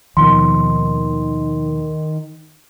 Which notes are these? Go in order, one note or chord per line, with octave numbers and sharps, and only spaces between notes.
D#2 B2 D#3 F3 C6